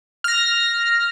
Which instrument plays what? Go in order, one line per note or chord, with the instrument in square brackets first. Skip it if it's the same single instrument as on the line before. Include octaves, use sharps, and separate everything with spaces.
[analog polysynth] F6 A#6